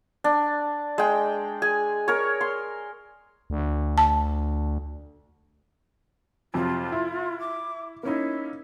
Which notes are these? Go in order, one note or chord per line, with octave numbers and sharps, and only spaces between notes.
D4
G#3 G5
G#4 G#5
A#4 C#5
C6
D2
A5
F2 C3 F#3 F4
E4
D6
A#3 C#4 D#4 E4